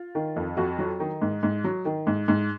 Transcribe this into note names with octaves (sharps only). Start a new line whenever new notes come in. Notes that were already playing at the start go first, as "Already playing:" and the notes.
Already playing: F4
D#3
F2
F2 F#4
F#3
D#3 D#4
G#2
G#2
F#3
D#3
G#2
G#2